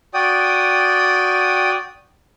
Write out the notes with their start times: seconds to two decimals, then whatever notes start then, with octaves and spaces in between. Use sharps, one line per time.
0.14 F#4 D5 G5 D#6